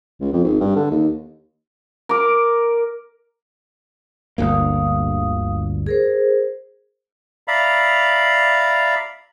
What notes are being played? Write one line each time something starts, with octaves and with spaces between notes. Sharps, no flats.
C#2
F2
G#1
G2
D3
D#2
A#4 D6
G1 D2 A#3 F5 D#6
G#4 A#4 C5
D5 E5 F5 A#5 B5